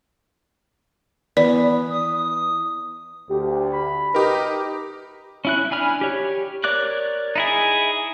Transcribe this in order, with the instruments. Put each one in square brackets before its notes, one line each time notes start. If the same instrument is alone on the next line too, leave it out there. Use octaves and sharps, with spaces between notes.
[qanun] E3 B3 [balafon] D5
[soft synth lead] D#6
[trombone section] D2 [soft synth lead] G4
[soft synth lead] B5
[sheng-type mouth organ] D#4 [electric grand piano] G4 A#4 [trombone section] B4
[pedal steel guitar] C#4 E4 F#6
D4 G#5 B5 F6
G4 C#5
A#4 C#5 D5 D6 F#6
D#4 E4 G#4